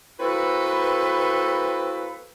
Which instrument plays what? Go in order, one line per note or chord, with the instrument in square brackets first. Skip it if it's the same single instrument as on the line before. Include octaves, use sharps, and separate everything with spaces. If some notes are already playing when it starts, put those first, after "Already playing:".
[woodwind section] A#3 C4 E4 F#4 A4 B4